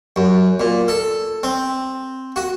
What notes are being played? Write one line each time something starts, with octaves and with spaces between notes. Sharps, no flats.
F#2
A#2
A4
C4
F#4